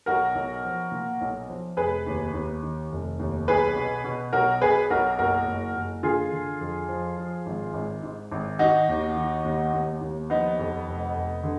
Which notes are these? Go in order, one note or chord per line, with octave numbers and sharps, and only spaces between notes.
B1 F#4 A#4
B1
F3
A#2
B1
F3
F1 G#4 B4
D#2
D#2
D#3
F1
D#2
B1 G#4 B4
B2
B2
B1 F#4 A#4
B2 G#4 B4
B1 F#4 A#4
F#1 F#4 A#4
F#1
F#1
D3 F4 G#4
D3
F2
F3
F3
G#1
G#1
G#2
G#1
D#3 D#4 F#4
D#2
D#3
D#2
D#2
D#2
F3 B3 D#4
F2
F1
F1
D3